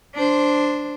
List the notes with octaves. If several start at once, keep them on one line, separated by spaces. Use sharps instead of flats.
D4 C5